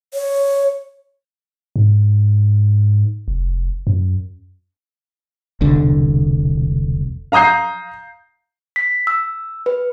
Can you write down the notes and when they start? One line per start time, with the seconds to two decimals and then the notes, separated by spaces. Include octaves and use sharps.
0.14 C#5
1.76 G#2
3.28 F1
3.87 F#2
5.61 E1 C2 D3
7.32 F5 A#5 D#6 G6 C7
8.76 B6
9.07 E6
9.66 B4